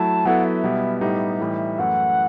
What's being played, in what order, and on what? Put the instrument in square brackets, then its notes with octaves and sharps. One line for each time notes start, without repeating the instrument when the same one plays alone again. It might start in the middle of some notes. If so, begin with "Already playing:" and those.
Already playing: [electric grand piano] F#3 A3 E4 [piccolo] A5
[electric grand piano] F#3 B3 E4 A4 [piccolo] F#5
[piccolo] E5
[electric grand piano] B2 G3 B3 E4
[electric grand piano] A2 G3 B3 D#4 G4 [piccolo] E5
[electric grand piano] A2 E3 G3 D#4
[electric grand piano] F#2 E3 A3 E4 [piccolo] F#5